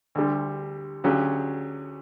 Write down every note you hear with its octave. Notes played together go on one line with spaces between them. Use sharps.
D2 D3 G3
D2 C#3 F#3 C#4 G4